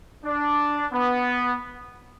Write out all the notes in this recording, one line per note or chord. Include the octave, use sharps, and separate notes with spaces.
D4
B3